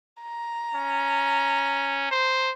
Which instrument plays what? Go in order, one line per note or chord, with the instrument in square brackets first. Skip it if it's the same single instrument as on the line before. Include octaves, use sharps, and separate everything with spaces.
[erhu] A#5
[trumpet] C#4
C5